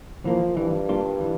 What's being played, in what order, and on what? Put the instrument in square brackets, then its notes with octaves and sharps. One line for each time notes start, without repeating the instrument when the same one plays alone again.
[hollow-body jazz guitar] E3 A#3 [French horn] F3
[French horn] G2 [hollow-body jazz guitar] E3
[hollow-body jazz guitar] G3 A#3 D4 F4
E3